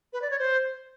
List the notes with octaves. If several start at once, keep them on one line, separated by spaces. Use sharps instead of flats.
B4
D5
C#5
C5